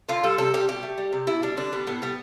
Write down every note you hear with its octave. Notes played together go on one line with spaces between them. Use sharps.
D3 F4
G3 A4
C3 A4
G3 G4
B2 G4
A3
G3
C3
B2 E4
G3 D4
D3 D4
G3 B3
A2 B3
G3 B3